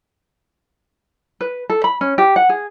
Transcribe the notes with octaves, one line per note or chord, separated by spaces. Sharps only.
B4
A4
B5
C#4
G4
F#5
G#4